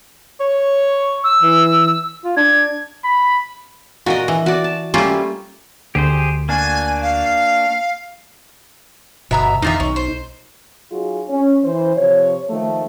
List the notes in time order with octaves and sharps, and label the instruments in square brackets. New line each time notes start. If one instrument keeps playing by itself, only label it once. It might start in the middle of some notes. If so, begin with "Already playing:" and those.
[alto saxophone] C#5
[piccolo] E6
[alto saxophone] E3
F4
[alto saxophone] D4 [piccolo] G#6
[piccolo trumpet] B5
[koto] A#2 [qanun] F#4 A#4 D#5
[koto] E3
[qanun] F#4 D5
A5
[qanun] G3 A3 [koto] A#3 C#4 F4
[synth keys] D2 [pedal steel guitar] G4 G#4 C5
[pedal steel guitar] A#3 D4 F#4 [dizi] G#5
[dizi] F5
[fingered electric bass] G1 [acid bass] B2 [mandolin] E5 A#5 E6
[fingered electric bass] E2 D3 D#3 [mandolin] A#3 F4 E5 [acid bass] D#4
[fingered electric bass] B1 [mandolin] C#4
[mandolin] C5
[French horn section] F#3 D#4 F4 F#4 G#4
C#4
E3 C5
C3 F3 C#5
D#3 F3 A3